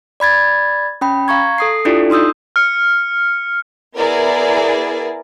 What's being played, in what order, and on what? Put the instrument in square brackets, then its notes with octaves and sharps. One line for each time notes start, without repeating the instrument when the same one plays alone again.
[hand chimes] D5 B5 G#6 A6
C#4 G5 B5
F5 A#5 C#6 G#6
A4 D#6 C7
D4 E4 F4 G4 A4 D5
D#4 C6 D#6 E6 G6
[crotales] F6 C#7
[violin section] B3 E4 G#4 A#4 D5